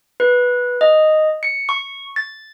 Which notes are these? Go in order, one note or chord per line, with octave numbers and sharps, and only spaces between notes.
B4
D#5
C#7
C#6
A6